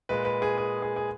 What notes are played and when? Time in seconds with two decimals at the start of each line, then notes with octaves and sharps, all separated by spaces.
0.09 A#2 G#3 B4
0.25 B4
0.42 G#4
0.58 G#4
0.82 G#4
0.96 G#4